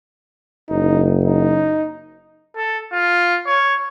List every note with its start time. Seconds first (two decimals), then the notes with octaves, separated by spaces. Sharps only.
0.69 F#1 D#4
1.24 D#4
2.56 A4
2.92 F4
3.46 C#5